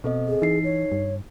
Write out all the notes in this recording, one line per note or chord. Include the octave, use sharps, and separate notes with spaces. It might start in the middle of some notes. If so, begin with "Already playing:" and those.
B2 C4 A4 D#5
G#4
E3 D#4 C7
C#5
G2